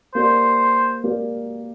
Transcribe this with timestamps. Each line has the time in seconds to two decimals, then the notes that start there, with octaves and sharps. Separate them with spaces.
0.15 A#3 G4 A#4 C5 D5
1.04 A#3 G4 A#4 D5